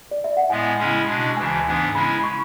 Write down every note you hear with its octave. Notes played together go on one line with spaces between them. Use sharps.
D5
E5
F#5
A2 G#3 B3 G#5
C#3 G#3 C#4 E4
B2 G#3 D4
D2 C#3 E3 G#5
G#2 E3 B3 D4
C#3 G#3 C#4 E4 B5
C#6